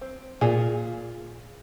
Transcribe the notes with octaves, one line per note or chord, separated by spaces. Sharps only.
C4
A#2 F4 G#4